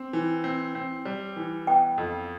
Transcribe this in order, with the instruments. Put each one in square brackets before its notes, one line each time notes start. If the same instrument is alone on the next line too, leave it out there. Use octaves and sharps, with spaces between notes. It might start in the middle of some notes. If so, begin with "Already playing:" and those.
Already playing: [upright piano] C4
E3
C4
C4
G3
E3
[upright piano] B3 [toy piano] G5
[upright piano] F2